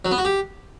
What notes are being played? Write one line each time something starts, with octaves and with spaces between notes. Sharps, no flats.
F#3
B3
F#4
G4